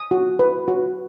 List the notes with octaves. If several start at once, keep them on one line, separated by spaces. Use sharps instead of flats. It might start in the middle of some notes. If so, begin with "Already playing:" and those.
Already playing: D#6
F#4
B4
F#4